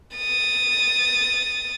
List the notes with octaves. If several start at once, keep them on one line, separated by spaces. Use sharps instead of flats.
D#6 A6